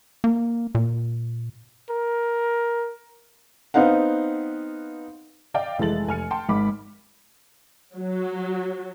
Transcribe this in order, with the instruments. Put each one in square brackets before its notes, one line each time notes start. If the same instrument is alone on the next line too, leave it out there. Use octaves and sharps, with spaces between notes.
[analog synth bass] A#3
A#2
[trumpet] A#4
[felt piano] B3 C4 D#4 F5 F#5
[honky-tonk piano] D5 D#5 F5 G5
F1 E3 G#3 A4 A6 F#7
F1 G#5 F6 C#7
G5 A5 C6
G#1 G#2 B5 D6 B6
[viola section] F#3